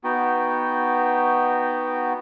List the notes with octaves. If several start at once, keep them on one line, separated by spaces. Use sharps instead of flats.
B3 D#4 F#4 G5